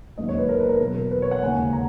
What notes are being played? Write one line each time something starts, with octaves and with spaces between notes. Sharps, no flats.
E1 D#2 D#3 F#3 A#3 D#5
C#5
B4
A#4
B4
A#4
E2 B2 F#3 A#4
B4
C#5
F#5
E1 D#2 C#3 G#5
A#5